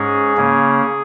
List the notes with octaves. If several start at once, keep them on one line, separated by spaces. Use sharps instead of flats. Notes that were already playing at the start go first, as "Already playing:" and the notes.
Already playing: G#2 G#3 C#4 G#4
C#3 A#3 C#4